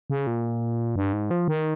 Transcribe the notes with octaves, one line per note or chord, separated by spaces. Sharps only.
C#3
A#2
G2
G#2
F3
D#3